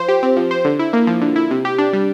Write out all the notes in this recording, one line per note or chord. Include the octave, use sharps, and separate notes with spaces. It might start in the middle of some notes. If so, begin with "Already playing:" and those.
Already playing: F3 C5
G4
C4
F3
C5
D3
E4
A#3
F3
D3
E4
C3
G4
D4
G3